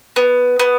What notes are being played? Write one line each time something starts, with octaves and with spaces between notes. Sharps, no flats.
B3
B3